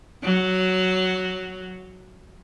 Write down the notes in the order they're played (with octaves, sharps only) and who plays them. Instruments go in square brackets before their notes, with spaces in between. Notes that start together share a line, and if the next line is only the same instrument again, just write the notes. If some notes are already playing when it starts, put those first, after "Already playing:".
[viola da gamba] F#3